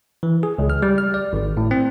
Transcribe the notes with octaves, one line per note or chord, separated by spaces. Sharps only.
E3
G#4
C#2
F6
G3
F6
D5
G#1
A2
C4